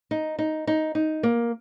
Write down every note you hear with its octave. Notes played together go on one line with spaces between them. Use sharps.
D#4
D#4
D#4
D#4
A#3